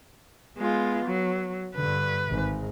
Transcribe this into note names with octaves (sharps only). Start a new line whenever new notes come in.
G#3 B3 F4
F#3
G2 D3 B4
G#1 G#2